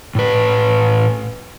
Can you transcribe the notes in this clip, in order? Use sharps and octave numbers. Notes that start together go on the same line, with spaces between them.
A2 B4